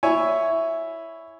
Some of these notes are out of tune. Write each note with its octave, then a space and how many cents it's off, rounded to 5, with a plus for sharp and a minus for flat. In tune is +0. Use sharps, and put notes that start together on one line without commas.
E4 +0 C#5 +5 G#5 +0